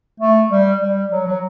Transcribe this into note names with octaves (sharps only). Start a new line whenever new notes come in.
A3
G3
G3
F#3
F#3